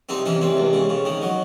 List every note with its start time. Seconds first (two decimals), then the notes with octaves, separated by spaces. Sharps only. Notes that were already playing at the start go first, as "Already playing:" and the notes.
0.09 C2 C4 D#4
0.26 E3 C#4
0.41 C2 C4
0.57 C#2
0.73 C#3
0.89 C#3
1.05 D#3
1.22 F#3